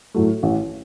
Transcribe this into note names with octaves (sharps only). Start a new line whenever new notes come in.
A2 F#3 A3
A1